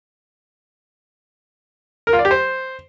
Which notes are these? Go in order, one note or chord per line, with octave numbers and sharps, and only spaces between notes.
A#4
F4
D5
G4
C5